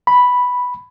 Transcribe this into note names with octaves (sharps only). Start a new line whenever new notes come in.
B5